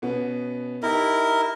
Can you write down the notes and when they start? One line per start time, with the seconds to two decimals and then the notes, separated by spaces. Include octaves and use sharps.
0.02 B2 B3 C#4
0.83 D#4 E4 G4 A#4